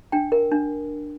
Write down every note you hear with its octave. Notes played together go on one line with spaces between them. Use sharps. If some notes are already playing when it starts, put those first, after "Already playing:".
D4 G5
A#4
D4